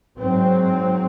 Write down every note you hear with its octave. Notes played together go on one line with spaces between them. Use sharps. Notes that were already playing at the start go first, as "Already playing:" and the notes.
G#2 F#3 C4